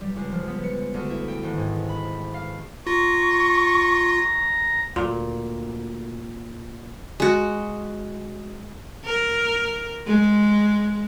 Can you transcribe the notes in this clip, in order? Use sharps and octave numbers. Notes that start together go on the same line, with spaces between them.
G3
C#2
F3
B3
C#7
D2
E4
G5
G#1
G#2
B5
F5
F4 A#5 C#6
D2 A#2
G#3 F#4
A#4
G#3